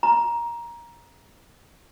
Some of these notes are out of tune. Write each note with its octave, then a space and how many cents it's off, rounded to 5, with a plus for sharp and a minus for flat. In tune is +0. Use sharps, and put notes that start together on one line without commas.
A#5 +15